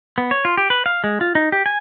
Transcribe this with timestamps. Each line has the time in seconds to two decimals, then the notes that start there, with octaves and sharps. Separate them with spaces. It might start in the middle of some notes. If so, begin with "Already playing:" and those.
0.18 B3
0.31 C#5
0.45 F4
0.57 G4
0.70 B4
0.86 F5
1.04 G#3
1.21 F4
1.35 D#4
1.52 G4
1.66 G#5